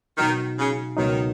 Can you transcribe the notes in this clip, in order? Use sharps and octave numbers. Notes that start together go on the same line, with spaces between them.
B2 D#3 F#3 D#4 F#4
C#3
C#2 B2 D#3 F#3 D#4